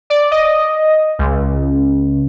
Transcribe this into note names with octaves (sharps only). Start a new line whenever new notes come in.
D5
D#5
C#2